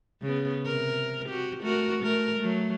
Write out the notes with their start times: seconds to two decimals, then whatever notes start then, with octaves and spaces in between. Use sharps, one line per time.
0.22 C#3 B3
0.66 C3 A#4
1.29 F#4 G4
1.62 A3 F#4 A#4
2.02 A3 A#4
2.39 F#3 A3